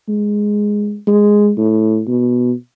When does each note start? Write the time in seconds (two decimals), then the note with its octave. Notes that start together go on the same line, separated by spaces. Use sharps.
0.08 G#3
1.07 G#3
1.57 A2
2.08 B2